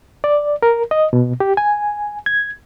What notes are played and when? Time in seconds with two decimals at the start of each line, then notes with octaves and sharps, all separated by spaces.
0.24 D5
0.63 A#4
0.91 D#5
1.13 B2
1.40 G4
1.57 G#5
2.26 G#6